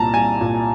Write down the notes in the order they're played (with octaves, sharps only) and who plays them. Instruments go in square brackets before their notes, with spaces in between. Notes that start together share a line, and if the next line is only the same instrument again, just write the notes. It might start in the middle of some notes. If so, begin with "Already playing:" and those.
Already playing: [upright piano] C2 A#2 A5 A#5
C2 G#5
A#2